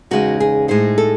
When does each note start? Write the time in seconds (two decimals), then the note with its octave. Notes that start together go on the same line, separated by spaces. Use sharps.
0.11 E2 C#3 G#3 D#4 F#4
0.40 G#4
0.68 A2 G#3 D#4 C5
0.98 A4